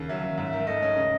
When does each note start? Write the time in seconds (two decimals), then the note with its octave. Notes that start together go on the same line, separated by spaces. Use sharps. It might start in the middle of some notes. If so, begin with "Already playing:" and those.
Already playing: D#2 C#3
0.09 F#3 E5
0.24 D#2
0.37 G#2 E5
0.53 D#3
0.67 A3 D#5
0.82 C#4
0.96 C#3